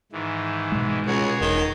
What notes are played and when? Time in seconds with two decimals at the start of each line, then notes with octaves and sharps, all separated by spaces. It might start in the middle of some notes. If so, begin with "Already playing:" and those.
0.12 G#2 D#3 E3
0.72 B2 G#3
1.07 C#2 F#4 G#4 C#5
1.41 E1 D#3